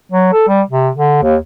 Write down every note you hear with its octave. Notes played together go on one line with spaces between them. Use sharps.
F#3
A4
G3
C3
D3
D#2